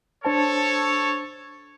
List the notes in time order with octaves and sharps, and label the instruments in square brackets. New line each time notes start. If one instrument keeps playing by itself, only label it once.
[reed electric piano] D4 C5 A5 [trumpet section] A4 C#5